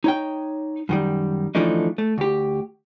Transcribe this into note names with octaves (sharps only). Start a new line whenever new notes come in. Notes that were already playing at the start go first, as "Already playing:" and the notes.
D#4 C#5 G5
F#2 D#3 G3
D3 E3 F3 A3 D4 D#4
A3
D2 G4